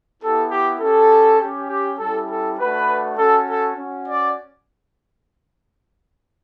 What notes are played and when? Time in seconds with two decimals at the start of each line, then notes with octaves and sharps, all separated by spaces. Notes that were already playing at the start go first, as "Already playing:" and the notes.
0.21 B3 E4 G4 A4
0.50 G4
0.80 C#4 G4 A4
1.40 C#4 G4
1.69 G4
1.99 G3 C#4 E4 G4 A4
2.29 A4
2.58 A3 D4 F#4 B4
3.17 C#4 F#4 A4
3.48 A4
3.76 C#4 F#4
4.07 D5